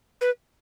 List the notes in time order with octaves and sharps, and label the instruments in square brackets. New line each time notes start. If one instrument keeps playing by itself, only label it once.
[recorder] B4